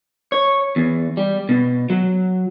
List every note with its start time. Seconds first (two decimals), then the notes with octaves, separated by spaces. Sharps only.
0.32 C#5
0.76 E2
1.17 G3
1.49 B2
1.90 F#3